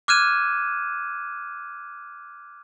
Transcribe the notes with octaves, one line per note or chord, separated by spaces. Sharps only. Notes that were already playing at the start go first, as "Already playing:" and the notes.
D6 F6 F#6 G#6 D#7 E7